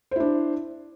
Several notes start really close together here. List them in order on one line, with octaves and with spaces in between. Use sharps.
C5 E4 D4